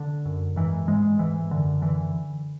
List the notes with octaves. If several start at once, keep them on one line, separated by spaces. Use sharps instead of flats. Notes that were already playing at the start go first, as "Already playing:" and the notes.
Already playing: D3
F#2
G#2 E3
G#2 G#3
G#2 E3
F#2 D3
D3 E3